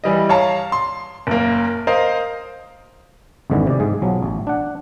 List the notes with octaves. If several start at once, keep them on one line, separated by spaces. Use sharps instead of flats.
E3 G3 D#5
C#5 F5 A5 A#5
C6
F#1 A#3
A#4 C5 D#5 F5
G#1 F2 G#2 D3 E3
C3 D5
G#2 G#4
B1 F3 F#3
A1
D4 F#5